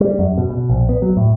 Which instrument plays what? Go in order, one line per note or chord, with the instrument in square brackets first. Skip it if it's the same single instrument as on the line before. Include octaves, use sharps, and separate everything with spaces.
[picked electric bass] G3
F#2
B2
B2
A#1
B3
F#3
A2